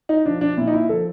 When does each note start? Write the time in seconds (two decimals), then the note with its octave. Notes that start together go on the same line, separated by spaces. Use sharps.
0.09 D#4
0.26 F3 D4
0.41 D4
0.57 A#2 E4
0.67 D#4
0.73 E4
0.89 F3 A4